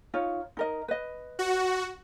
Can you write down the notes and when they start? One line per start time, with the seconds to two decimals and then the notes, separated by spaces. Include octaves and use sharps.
0.14 D#4 F4 C#5
0.57 D#4 A#4 D#5
0.88 B4 D#5
1.39 F#4